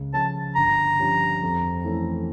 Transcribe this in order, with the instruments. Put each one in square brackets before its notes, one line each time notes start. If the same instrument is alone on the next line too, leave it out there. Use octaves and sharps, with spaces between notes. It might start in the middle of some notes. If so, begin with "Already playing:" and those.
Already playing: [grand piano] C#2
[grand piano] C#3 F3 C#4 [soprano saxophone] A5
[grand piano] G1 [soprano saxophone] A#5
[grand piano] G2 F3 C#4 G4
F2
E3 A3 C#4 E4